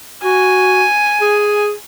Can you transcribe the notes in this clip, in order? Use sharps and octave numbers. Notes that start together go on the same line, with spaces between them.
F#4 G#5
G#4